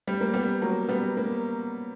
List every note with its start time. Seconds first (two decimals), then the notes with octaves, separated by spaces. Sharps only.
0.08 G3
0.21 A#3
0.34 G3 B3
0.62 F#3 A#3
0.89 G3 B3
1.17 A#3